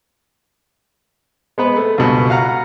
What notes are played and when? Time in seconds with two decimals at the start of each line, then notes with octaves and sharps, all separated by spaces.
1.58 G#3 B3 B4
1.77 A3
1.98 C#2 G2 B2
2.30 F5 F#5 A#5